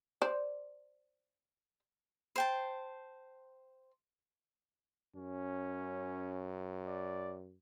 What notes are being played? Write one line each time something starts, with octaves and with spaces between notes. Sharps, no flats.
C5 D5
C5 G5 A5
F#2 C#4
D5